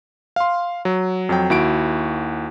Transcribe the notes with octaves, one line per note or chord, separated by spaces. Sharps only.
F5 C6
F#3
F2 F#3 G5
D#2 E4 F#4 D7